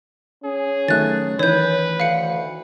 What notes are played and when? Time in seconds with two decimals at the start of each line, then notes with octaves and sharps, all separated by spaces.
0.44 C#4 G#4
0.88 D#3 F#3 A3 F#6 A6
1.39 D#3 E3 B4 C#5 G6
2.00 D2 F5 C#7